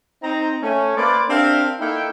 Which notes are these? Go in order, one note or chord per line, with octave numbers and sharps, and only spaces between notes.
C4 D#4 A#5
A3 C#4
A#3 B4 C5 D5
C4 D4 G4 A#4 E5 F5
A#3 D#4 E4 A4 E5 G5